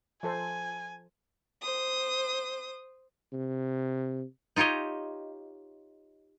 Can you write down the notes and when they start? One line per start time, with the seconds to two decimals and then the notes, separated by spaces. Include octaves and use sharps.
0.23 F3 A4 C5 G#5
1.62 C5 D#6
3.33 C3
4.56 D#4 F4 G4 C#5 D#5